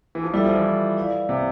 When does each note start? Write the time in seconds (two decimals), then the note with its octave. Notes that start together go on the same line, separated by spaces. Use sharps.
0.15 E3
0.24 F3
0.34 G3 E4 A4 E5
0.45 F3
0.55 E3
0.97 E4 B4 D5 F5
1.29 C3